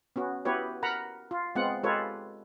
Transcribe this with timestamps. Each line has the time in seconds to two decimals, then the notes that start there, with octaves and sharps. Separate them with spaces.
0.16 B3 C#4 F#4
0.45 B3 E4 F#4 G4 B4 C#5
0.83 A#4 F#5 A#5 B5
1.31 F4
1.55 G#3 B3 C4 F4 F#5
1.83 G#3 F4 G4 A4 B4 C#5